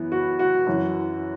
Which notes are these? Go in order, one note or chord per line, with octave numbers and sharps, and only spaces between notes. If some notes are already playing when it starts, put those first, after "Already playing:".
Already playing: F#2 E3 B3
F#4
F#4
F#2 E3 C#4